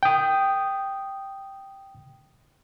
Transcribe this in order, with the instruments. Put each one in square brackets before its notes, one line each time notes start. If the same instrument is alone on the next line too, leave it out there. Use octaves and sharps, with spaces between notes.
[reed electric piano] G5 D#6